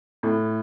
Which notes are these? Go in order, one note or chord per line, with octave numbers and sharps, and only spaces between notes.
A2